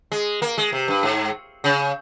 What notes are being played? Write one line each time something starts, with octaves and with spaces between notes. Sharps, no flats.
G#3
A#3
G#3
C3
G2
G#2
C#3